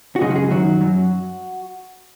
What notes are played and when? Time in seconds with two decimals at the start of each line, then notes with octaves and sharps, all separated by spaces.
0.16 F#4
0.21 F#2 C#3 G#3 G#4
0.30 F#4
0.36 G#4
0.50 F#2 D#3 F#3 F#4
0.81 F#2 F#3